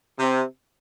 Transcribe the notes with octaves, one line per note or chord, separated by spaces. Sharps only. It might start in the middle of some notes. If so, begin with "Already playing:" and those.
C3